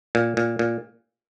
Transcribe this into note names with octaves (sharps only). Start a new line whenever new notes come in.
A#2
A#2
A#2